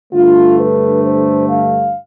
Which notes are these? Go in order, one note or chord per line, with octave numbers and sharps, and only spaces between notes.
G2 D3 A3 F4
B4
C5
F5